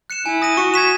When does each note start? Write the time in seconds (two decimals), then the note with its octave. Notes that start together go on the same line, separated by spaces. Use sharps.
0.10 F#6 C#7 E7
0.26 E4 G#5
0.42 D#6 A#6 D#7
0.57 F#4 C#6
0.74 G#6 B6 E7